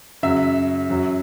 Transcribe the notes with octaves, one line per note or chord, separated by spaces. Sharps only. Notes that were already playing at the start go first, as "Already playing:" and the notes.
F#2 C#3 F#3 E5
F#2 F#3